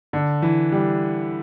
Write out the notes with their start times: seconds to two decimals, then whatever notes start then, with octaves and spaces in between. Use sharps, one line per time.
0.13 D3
0.42 E3
0.72 G3